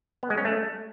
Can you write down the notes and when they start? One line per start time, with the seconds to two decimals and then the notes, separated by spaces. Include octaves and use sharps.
0.23 B3
0.30 G#3
0.38 C#4
0.45 A3